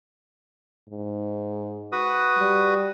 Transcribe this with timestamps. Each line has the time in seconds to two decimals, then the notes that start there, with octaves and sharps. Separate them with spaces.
0.89 G#2
1.92 F#4 B4 D#6
2.38 G3